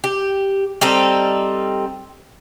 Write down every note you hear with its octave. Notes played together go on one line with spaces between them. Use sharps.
G4
G3 C4 D#4 A4